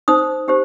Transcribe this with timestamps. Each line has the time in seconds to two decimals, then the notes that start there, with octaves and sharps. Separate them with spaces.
0.08 D#4 C5 D#6
0.48 D#4 G4 C5